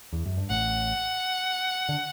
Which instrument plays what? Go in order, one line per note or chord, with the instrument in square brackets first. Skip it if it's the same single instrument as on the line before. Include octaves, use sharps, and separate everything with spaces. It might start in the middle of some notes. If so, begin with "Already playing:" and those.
[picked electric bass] E2
F#2
G2
[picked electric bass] A1 A2 [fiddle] F#5
[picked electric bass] D3